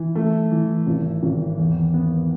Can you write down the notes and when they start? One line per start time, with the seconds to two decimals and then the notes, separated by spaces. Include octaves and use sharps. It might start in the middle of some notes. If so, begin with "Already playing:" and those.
Already playing: E3
0.15 A3
0.51 E3
0.87 G#1
1.23 G#1
1.58 E2
1.94 B3